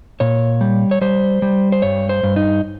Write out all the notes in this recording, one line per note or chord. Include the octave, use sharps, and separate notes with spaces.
A#2 C#5
G3
C#5
G3 C5
G3
C5
G2 C#5
C5
G2
D#4